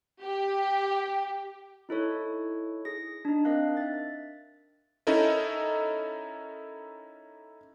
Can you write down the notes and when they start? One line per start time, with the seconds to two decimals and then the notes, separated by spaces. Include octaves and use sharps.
0.22 G4
1.89 D#4 E4 A4 C#5
2.85 G#4 A#6
3.25 D4 D#4
3.45 C4 D4 A#4 D#5 F5 F#6
3.77 E5 A6
5.07 C#4 D#4 E4 A4 A#4 D#5